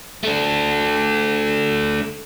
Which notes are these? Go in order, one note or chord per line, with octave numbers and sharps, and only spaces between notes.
A3 D4